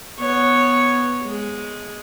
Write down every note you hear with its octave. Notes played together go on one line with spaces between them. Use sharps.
B3 C#5
G#3